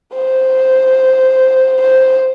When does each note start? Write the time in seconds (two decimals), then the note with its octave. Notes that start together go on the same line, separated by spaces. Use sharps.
0.14 C5
1.82 C5